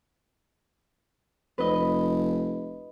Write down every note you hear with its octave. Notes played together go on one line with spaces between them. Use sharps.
F1 B4 D#5